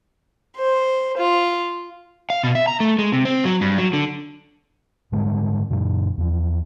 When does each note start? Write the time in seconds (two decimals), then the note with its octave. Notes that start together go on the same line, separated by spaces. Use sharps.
0.57 C5
1.18 F4
2.30 F5
2.43 B2
2.55 E5
2.67 A#5
2.80 A3
2.99 G#3
3.12 C3
3.25 C4
3.45 F#3
3.61 G2
3.78 F#3
3.93 D3
5.12 G#2 D3 G3 G#3
5.70 F#2 A#2 F#3
6.17 E2 F3